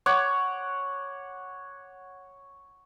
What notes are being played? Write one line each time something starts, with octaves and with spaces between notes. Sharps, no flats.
C#5 F#5 D6